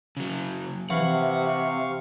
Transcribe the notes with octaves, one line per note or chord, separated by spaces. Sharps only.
C#3 F#3
C3 E3 F5 F#5 C#6